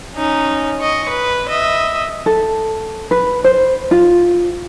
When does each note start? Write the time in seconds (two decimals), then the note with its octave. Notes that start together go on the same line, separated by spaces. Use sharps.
0.15 C#4 D#4
0.80 D#5 C#6
1.09 B4
1.48 D#5 E5
2.26 A4
3.11 B4
3.44 C5
3.91 F4